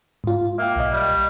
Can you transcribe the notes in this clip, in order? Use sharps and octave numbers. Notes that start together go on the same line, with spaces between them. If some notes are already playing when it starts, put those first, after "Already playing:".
G#2 F4
A#3 E5 G5
B1 D#5
G3